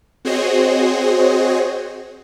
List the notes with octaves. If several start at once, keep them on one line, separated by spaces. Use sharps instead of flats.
C4 F#4 G#4 C5 C#5 D#5